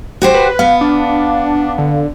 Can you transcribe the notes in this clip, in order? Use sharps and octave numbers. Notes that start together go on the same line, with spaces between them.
F#4 G4 C5
B4
B3 F5
D4
D3